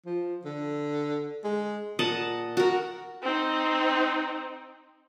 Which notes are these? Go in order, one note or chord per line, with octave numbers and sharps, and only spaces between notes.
F3
D3
G#3
A#2 D#5 F#5 A5
F#4 A#4
C4 D#4